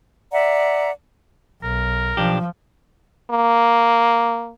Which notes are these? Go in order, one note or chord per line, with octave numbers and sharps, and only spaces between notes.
D5 E5 F#5 A#5
B1 A#4
B1 F3 D4 G4
A#3